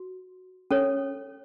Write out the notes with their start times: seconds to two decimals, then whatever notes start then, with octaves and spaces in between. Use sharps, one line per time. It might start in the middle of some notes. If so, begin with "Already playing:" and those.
Already playing: F#4
0.71 C#4 A4 C#5